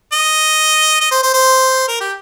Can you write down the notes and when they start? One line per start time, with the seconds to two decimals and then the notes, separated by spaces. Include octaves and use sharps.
0.12 D#5
1.01 D#5
1.11 C5
1.23 C5
1.34 C5
1.88 A#4
2.00 G4